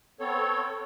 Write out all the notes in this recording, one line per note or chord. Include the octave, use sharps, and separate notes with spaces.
B3 C4 A4 C#5